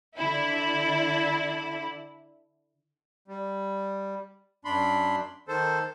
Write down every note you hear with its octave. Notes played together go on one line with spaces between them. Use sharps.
D3 E4
G3
F#2 D4 B5 C6
D#3 A4 C5